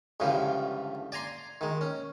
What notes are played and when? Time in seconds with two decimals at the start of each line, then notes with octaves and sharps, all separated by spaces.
0.20 C#2 G2 D3 E3 F3
1.12 D5 G#5 A#5 C6
1.61 D#3 G#3
1.81 C#4